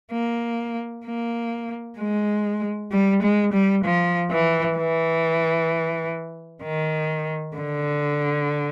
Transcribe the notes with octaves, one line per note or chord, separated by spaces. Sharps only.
A#3
A#3
G#3
G3
G#3
G3
F3
E3
E3
D#3
D3